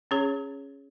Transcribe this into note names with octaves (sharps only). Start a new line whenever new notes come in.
C#4 G#4 C#5